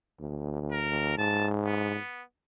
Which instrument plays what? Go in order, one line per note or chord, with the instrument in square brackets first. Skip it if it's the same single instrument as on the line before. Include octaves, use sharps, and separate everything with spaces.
[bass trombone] D2
[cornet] A#4
[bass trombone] G#2 [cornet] A5
[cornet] B3